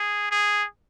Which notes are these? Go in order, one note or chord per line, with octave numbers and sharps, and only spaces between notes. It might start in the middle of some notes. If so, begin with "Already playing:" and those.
Already playing: G#4
G#4